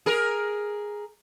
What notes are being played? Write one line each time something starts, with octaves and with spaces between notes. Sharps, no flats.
G#4 A#4